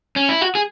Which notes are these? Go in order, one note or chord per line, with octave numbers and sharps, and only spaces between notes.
C#4
E4
F#4
G#4